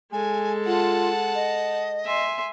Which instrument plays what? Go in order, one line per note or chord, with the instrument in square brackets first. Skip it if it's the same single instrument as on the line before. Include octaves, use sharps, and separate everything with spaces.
[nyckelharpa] G#3 A4 [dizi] G#5
[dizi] F4 [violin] F#5 A5
[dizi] D#5
[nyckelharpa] E5 C6 [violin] G#5